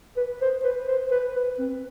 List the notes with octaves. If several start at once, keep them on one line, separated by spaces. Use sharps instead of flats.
B4
C5
B4
C5
B4
B4
C4